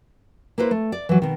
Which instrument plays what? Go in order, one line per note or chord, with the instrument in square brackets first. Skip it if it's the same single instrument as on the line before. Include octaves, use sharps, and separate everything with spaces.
[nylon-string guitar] A#3 E4 B4 C5
A3
D5
E3 F#3
B2 D#3